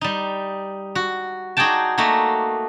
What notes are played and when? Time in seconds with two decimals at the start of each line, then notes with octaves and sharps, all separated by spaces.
0.01 G3 D#4
0.95 F#4
1.57 D#4 F#4 G#4 D5 G5 A5
1.98 A3 A#3 D#4 F#4